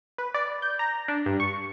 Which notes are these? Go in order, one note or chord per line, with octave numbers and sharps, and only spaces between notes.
B4
D5
G6
A#5
D4
G2
C#6